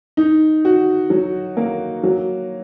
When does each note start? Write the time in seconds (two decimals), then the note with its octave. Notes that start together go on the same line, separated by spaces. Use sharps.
0.17 D#4
0.65 F#4
1.10 F#3
1.57 A#3
2.03 F#3